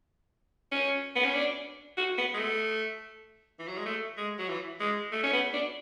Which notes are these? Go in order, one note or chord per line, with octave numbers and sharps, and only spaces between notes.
C#4
B3
C#4
D4
F#4
B3
G#3
A3
E3
F#3
G#3
A3
G#3
F#3
E3
G#3
A3
C#4
B3
D4